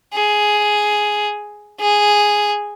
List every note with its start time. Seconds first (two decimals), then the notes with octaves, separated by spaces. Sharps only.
0.13 G#4
1.80 G#4